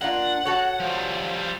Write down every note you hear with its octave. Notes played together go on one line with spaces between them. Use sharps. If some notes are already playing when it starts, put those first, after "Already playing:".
A#3 D4 F4 F#5
F#4 A4 C#5
F3 G3